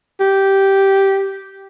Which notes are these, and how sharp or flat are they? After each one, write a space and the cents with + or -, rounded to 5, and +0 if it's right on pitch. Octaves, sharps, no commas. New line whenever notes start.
G4 -10